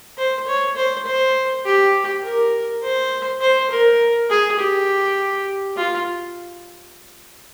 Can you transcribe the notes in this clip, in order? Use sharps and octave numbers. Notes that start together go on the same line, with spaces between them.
C5
C#5
C5
C5
G4
A#4
C5
C5
A#4
G#4
G4
F4